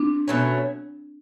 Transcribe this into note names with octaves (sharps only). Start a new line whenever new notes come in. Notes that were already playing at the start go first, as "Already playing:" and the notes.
Already playing: C4 D4
B2 F#3 A3 C#4